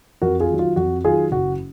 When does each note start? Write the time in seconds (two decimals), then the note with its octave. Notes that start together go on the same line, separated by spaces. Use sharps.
0.22 F2 F#4 A#4
0.40 F4 G#4
0.50 D#3 F#3
0.59 F4
0.76 F2 F#4
1.04 D#3 F#3 F4 G#4
1.32 F#1 F#4